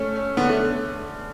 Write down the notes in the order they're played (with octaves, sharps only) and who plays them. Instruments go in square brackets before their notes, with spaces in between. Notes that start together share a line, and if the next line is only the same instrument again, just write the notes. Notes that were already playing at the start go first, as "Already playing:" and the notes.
Already playing: [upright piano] A3 C#4
C#4
[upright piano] D3 [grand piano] B3
[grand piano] A3